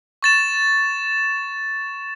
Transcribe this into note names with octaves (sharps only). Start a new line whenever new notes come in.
C#6 A6 E7